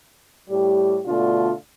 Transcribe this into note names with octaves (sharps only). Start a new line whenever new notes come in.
A2 G3 G4
B2 D3 A3 D4 F4